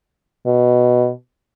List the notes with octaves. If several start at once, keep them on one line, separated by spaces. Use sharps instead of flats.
B2